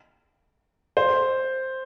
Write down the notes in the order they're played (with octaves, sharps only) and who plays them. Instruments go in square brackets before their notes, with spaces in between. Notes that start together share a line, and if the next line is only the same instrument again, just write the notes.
[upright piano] C5